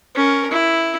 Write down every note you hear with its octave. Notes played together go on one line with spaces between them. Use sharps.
C#4 A#4
E4